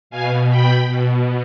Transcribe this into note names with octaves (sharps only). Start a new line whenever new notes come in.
B2 F5 G#5
G5 B5
B2